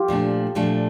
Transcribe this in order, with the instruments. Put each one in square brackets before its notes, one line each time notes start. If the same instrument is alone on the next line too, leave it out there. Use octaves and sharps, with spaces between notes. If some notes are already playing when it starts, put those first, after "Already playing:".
Already playing: [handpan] F4 G4
[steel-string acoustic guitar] A#2 F3 A3 D4
A#2 F3 A3 D4